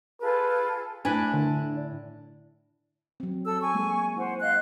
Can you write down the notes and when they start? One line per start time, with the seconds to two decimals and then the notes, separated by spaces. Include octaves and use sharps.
0.21 F4 G#4 A4 B4
1.05 A2 D4 B4 G#5
1.33 D3
3.20 F#3 C4
3.46 A4 E6
3.61 G#5 C#6
3.74 F#3 G#3 A#3
4.17 E4 C5 F#5
4.41 D#5 F5 F#6